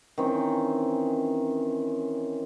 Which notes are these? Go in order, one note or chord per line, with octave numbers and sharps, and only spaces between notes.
D#3 E3 C4 C#4